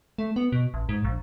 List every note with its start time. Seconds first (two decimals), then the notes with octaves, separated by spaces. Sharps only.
0.18 A3
0.36 B3
0.52 B2
0.74 A1
0.89 G#2
1.05 A#1